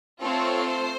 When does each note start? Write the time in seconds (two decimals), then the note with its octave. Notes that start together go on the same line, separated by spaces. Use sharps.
0.22 A3 C4 F4 A4 C#5
0.67 C5